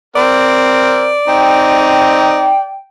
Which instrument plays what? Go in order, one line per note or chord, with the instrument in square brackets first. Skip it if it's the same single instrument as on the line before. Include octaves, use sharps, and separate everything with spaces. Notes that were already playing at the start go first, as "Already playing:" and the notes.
[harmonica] C4 A#4 [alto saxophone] D5
[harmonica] C4 D#4 [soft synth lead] G5